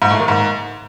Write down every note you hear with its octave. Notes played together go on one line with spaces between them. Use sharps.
G#2
A2
D#3
G#2